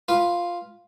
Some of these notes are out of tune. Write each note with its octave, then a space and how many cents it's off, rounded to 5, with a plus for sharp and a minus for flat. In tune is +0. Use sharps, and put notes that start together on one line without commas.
F4 +0 B4 -10